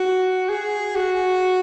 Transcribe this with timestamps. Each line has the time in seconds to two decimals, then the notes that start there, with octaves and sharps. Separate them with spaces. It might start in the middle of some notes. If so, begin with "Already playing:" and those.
Already playing: F#4
0.49 G#4
0.96 F#4